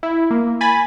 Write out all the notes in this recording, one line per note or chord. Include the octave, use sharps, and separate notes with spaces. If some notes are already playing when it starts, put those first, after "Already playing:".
E4
A#3
G#5 B5 A6